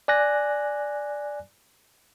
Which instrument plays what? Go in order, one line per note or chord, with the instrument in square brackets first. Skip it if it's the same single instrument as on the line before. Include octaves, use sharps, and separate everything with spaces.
[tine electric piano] D5 G#5 F#6 A#6